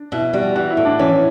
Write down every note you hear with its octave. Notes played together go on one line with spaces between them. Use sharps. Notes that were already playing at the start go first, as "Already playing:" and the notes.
Already playing: D4
B2 E4
G3 F#4
E3 F#4
E4
A2
D4
E3 C#4